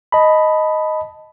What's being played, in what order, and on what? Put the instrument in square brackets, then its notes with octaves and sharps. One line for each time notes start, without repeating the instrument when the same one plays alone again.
[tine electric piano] D#5 A5 B5